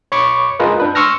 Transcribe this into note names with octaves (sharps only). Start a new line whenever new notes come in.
C#5 B5 C#6 D6
F4 G#4 A#4 B4 D#5
D4 B4
C6 C#6 E6 F6 A#6